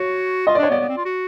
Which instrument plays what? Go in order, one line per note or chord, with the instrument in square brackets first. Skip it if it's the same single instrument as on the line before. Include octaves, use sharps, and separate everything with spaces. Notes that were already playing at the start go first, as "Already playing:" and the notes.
Already playing: [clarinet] F#4 [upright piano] C#5
[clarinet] F4 [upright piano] D#5
[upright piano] D5
[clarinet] D4 [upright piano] C#5
[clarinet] B3 [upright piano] D5
[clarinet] B3
C4
F4
F#4